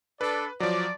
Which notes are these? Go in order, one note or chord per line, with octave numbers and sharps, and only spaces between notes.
D4 A4 B4 D5
F3 F#3 D5